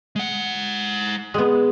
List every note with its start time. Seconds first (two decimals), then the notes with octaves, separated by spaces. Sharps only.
0.16 G#3 F#5
1.34 G#3 B3